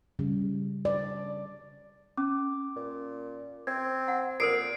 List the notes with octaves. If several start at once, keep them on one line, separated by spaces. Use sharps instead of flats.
C#3 G3
D5
C#4 D6
A#2
C4 G#6
F#5
A#2 A4 A#4 C5 C7 D7